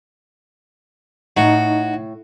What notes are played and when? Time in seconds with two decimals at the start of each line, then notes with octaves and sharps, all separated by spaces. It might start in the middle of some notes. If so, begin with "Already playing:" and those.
1.37 A2 D#4 F#4